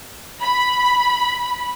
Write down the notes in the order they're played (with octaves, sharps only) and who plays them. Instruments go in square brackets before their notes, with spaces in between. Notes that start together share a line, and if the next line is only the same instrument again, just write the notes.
[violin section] B5